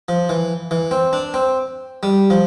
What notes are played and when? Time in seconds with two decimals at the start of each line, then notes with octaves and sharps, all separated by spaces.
0.09 F3
0.29 E3
0.71 E3
0.91 C4
1.13 D4
1.34 C4
2.03 G3
2.30 F3